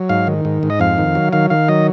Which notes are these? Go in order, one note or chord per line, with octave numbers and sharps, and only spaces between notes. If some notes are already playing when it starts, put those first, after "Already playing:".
Already playing: F#3
G#2 F5
D#3
G#2
G#2
D#5
F2 F5
D#3
F#3
D#3 F5
D#3 F5
F#3 D#5